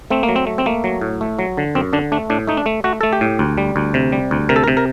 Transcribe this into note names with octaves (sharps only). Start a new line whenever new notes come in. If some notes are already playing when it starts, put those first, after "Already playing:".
A3 C4
A#3
F#3
C4
A3
C4
A3 A#3
F#3
A2
A3
F#3
D3
F#2 C4
D3 D4
A3 D4
A2 D4
A3 D#4
D4
A3
A3 F#4
A3 A4
G4
A2
D2
G3
D2
C3
G3
D2
C3 A#4
A4
A#4
C3
A#4